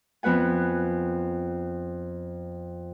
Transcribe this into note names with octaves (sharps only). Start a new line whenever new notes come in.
F2 B3 B4 F#5 G#5